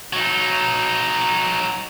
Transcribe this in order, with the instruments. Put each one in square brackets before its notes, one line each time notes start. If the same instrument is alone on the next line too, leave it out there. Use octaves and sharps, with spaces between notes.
[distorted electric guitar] F#3 D#4